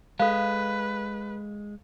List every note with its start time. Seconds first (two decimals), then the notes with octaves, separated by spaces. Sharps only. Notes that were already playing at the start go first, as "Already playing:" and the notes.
0.20 G#3 A4 B4 F5